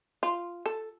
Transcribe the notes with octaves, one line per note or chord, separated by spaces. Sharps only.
F4
A4